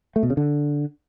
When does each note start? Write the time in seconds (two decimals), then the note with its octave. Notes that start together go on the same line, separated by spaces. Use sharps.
0.16 A3
0.23 B2
0.30 C#3
0.37 D3